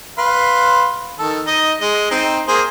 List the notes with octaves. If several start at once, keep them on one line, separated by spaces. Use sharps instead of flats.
B4 F5 C6
D#3 A4
D#4 D#5
G#3 D#5
C4 D#4
A#3 G#4 C5